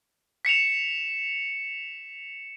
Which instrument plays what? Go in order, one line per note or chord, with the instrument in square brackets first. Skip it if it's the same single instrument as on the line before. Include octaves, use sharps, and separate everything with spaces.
[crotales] B6 C#7 E7 F7